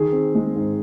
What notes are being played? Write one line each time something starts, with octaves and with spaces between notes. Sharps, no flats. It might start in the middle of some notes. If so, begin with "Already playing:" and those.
Already playing: D#3 G#4
C4
G#3
G#2